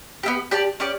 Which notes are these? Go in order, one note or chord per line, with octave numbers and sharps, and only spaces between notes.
B3 E4 G4
G4 D5 A5
C#4 G4 D5